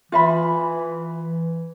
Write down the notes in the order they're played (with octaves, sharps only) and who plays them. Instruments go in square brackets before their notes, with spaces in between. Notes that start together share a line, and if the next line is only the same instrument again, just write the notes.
[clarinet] E3 [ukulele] F4 E5 B5